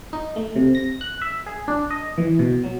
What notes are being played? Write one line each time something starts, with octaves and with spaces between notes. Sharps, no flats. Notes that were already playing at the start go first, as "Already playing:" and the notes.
D#4
A3
C3
A#6
F#6
E5
G#4
D4
D#5
E3
B2
F#3